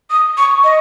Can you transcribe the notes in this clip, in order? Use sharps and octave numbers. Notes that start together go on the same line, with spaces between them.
D#6
C#6
D#5